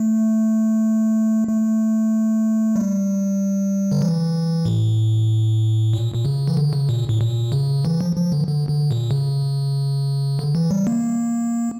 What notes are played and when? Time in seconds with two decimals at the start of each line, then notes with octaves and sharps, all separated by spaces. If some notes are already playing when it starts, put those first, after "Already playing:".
Already playing: A3
1.48 A3
2.76 G3
3.91 D3
4.02 E3
4.65 A2
5.93 A#2
6.14 A#2
6.25 C#3
6.48 E3
6.57 D3
6.73 C#3
6.89 A#2
7.09 A2
7.21 A#2
7.52 C#3
7.85 E3
8.01 F3
8.16 F3
8.32 D3
8.48 D3
8.69 D3
8.91 A#2
9.11 C#3
10.39 D3
10.55 E3
10.71 G3
10.87 A#3